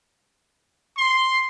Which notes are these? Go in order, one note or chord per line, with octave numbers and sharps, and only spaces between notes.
C6